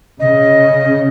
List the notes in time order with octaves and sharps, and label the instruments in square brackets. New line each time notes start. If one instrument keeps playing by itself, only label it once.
[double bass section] C#3 [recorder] D#5